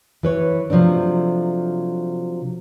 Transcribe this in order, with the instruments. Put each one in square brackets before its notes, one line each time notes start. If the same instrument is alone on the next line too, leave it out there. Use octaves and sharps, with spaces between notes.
[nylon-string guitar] E3 B4 C#5
C3 F3 F#3 A3 D4